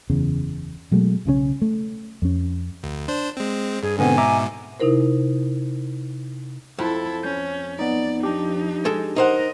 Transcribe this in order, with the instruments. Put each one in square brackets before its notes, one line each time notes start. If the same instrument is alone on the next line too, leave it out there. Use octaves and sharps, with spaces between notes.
[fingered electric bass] F#1 E2 C#3
B2 F#3 G#3 A3
B1 C#3 E3 C#4
A3
F2 C#4
[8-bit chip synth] D2
D4 C5
G#3 C4
[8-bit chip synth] G2 [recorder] G#4
[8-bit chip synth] G#2 B2 [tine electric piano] D3 B3 C4 [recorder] G#5
[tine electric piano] E5 A#5 D6
[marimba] C3 D#4 E4 A#4 C5
[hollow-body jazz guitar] F2 [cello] E4 A4
[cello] C#4 [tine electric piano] G6
[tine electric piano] B3 D#4 [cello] D5
[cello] F3 D#4 [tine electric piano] D4 G4
[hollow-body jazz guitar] G#3 A4
[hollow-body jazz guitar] D#4 C5 F#5 [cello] A#4 D#5